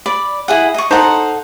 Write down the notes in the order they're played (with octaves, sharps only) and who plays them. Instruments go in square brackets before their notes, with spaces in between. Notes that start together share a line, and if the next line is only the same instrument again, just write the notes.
[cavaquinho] D5 B5
E4 G#4 F#5
D#5 C#6
[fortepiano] D#4 C5 A#5 [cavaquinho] A4 F#5